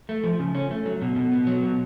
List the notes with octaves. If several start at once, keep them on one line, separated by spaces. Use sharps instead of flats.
A3
F3
C#3
C#4
A3
F#3
B2
B2
B3
F#3
B2